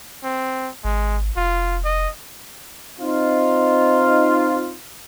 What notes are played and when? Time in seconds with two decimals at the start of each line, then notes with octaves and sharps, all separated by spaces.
0.24 C4
0.84 G#1 G#3
1.37 F1 F4
1.85 D#5
2.98 C4 D#4 F4